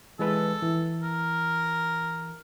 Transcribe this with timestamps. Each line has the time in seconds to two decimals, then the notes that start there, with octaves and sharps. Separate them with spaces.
0.19 E3 G#3 A4 B4
0.62 E3
1.03 A#4